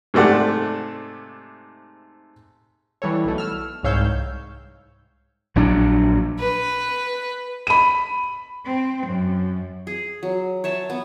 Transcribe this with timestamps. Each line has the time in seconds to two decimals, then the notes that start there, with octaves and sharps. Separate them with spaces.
0.14 G#2 C3 A3 D5 F#5
3.02 E3 G3 A4 C#5
3.25 B1 B2 A3
3.38 E6 F6
3.83 C2 G#2 C#5 F5 E6 G6
5.56 A#1 F#3 D4
6.39 B4
7.67 B5 D#7
8.66 C4
9.06 F#2
9.87 G#4
10.23 F#3
10.64 C#5 E5 A5
10.90 B3